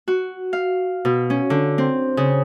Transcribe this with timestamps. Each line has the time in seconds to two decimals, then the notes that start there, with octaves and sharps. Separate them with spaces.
0.08 F#4
0.53 F5
1.05 B2
1.30 C#4
1.50 D3
1.78 C4
2.17 C#3